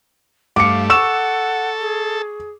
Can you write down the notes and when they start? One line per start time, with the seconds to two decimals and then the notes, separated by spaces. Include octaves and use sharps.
0.56 G2 A3 F5 D6 C#7
0.90 A4 F#5 C#6 E6 E7
1.80 G#4